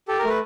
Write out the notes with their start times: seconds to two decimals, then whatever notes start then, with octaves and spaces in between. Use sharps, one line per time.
0.08 G4 A4
0.19 A#4
0.24 A3 B4